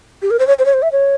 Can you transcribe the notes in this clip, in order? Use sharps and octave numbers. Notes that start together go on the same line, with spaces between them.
G4
A#4
C5
C#5
C5
C#5
C5
E5
C#5